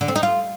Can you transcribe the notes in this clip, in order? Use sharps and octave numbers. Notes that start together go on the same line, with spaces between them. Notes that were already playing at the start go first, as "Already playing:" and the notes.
D3
C4
D#4
F4